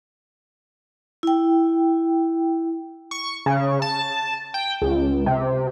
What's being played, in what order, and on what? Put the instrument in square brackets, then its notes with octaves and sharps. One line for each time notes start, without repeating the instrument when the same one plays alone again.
[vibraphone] E4 G5
[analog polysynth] C#6
C#3
A5
G5
C#2
C3